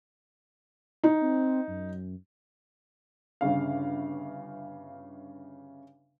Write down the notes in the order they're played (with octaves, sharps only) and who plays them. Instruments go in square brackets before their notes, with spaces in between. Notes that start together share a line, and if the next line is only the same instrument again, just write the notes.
[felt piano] D#4
[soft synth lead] C4
F#2
[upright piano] G1 G2 C#3 F5